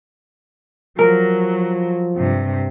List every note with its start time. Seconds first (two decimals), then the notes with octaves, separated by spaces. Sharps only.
0.99 F3 F#3 A#4
2.16 G2 C3